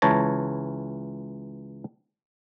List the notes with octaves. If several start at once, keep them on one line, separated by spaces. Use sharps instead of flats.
C#2 E3 C#5 A5 A#5